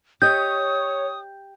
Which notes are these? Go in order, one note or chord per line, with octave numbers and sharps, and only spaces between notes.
G4 C#5 D#5 D#6 G6